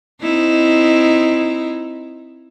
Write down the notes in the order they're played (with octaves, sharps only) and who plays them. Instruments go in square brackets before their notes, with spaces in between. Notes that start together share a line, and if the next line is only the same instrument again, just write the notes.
[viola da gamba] C4 D#4 E4